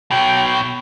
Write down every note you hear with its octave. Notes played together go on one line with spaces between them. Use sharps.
B2 F#3 G5